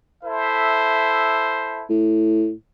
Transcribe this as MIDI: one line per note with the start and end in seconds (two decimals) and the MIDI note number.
0.24 1.83 64
0.24 1.83 69
0.24 1.85 72
0.24 1.83 76
1.90 2.51 45